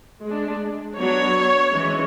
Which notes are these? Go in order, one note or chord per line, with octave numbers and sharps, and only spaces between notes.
G#3 D4
F#3 B3 D4 C#5
E3 G#3 C#4